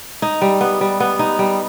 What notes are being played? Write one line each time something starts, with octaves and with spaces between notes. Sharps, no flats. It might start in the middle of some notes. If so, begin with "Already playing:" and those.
D#4
G3
B3
G3
B3
D#4
G3